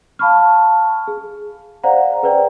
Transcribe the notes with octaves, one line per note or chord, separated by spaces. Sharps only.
F5 A5 B5 C#6 F6
G#4
C5 D5 F5 F#5 A#5
G#4 B4 C5 D5 G5